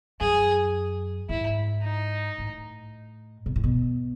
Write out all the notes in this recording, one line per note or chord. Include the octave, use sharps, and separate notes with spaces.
F#2 G#4
G#2 E4
D#4
A2
B2
A2
B2